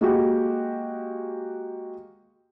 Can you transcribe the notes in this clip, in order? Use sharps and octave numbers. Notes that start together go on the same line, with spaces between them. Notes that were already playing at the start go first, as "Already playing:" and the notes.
G#3 A#3 F#4 G4